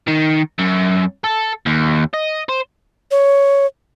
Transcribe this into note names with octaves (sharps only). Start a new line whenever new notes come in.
D#3
F#2
A4
D#2
D#5
C5
C#5